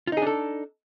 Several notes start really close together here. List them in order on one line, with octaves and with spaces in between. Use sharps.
F4 D#4 G#4 D4 A4